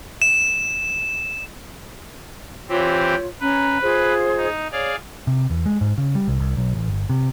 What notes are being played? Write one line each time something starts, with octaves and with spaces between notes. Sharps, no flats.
E7
E3 C4 F4 G4 C#5
C#4 B4 A#5
F4 G#4 C5
D#4
G#4 C#5 D5 F5
C3
E2
G#3
G#2
C#3
G3
C2
C2
B1
A1
G1
C3